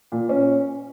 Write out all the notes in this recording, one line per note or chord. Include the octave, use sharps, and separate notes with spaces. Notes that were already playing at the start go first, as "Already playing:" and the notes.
A#2
C#4